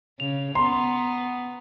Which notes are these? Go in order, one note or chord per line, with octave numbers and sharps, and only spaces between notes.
C#3 F7
B3 A#5 C6